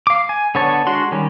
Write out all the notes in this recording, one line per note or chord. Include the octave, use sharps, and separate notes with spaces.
F5 D6
G#5
D3 B3 C#5 A5 C#6
G#3 D4 F#4 F#5 C6
D#3 G3 C#4